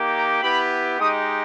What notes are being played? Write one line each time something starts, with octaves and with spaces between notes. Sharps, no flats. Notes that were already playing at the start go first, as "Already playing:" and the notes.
Already playing: A#3 D#4 G4
A#5
B3 E4 G4 B5
G#3 D#4 G4 D#6